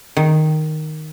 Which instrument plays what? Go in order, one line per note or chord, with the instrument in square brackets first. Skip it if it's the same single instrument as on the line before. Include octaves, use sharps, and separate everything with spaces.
[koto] D#3